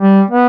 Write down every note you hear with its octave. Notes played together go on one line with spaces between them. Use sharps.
G3
B3